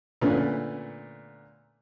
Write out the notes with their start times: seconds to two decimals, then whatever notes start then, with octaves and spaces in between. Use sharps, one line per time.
0.21 A#2 D3 A3 B3 C#4